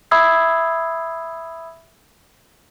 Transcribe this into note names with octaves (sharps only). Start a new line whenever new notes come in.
E5 B5 D#6 E6 G#6 C7